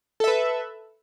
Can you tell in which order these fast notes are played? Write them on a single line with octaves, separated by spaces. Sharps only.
A4 E5 B4